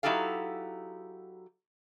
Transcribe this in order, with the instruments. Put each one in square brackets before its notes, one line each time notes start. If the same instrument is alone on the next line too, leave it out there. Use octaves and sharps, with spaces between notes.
[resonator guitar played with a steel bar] F#3 D#4 E4 G4 A4 F5